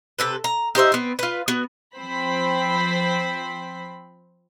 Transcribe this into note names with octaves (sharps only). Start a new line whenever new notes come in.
C3 A4 B4
A#5
D#4 G4 C5 E5
B3 C4
F4 B4
B3 F#4
F3 C4 C5 B5 B6